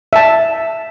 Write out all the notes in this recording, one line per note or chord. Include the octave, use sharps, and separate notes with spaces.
E5 A5